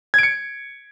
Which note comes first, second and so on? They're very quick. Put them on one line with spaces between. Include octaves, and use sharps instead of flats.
G#6 D7 C#7